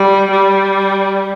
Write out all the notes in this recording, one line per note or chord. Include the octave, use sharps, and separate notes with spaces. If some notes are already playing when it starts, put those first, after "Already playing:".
Already playing: G3
G3